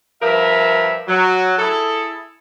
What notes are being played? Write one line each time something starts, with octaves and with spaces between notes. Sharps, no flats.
G2 F3 A#4 E5
F#3
E4 G#4 A4